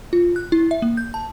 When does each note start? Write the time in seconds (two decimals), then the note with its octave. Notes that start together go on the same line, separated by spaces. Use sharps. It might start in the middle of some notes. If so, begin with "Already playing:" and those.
0.13 F4
0.36 F#6
0.52 E4
0.71 E5
0.82 A#3
0.97 G6
1.14 A5